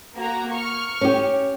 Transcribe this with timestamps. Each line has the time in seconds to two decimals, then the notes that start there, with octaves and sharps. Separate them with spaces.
0.15 A#3 F#4 A#5
0.52 C#6 F6
1.01 C#4 G4